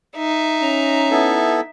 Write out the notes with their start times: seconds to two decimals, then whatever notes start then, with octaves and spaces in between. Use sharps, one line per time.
0.17 D#4 E5
0.62 C#4 A#5
1.11 B3 E4 A4